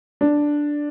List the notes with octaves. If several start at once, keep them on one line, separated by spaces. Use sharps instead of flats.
D4